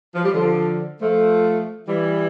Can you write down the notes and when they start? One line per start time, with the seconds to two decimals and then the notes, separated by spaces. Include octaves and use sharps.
0.15 F3
0.24 G3
0.33 D3 F3
1.01 F3 A3
1.87 E3 G3